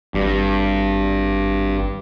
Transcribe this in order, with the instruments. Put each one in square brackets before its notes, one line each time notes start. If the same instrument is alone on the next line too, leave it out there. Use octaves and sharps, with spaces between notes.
[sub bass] G#1 [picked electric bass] G2